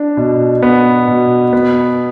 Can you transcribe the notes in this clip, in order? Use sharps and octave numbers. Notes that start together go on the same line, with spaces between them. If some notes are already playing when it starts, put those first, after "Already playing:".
Already playing: D4
B2
B3
B2
B3